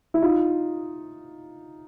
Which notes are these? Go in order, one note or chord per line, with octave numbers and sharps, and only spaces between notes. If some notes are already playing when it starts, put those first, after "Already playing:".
E4
D#4 F4